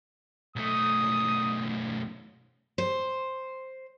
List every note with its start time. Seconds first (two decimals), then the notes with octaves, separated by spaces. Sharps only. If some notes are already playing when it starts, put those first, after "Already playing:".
0.56 B1 A3 D#6
2.78 C5